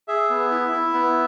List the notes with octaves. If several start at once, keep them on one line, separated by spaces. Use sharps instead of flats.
G#4 E5
B3
E4
E4
B3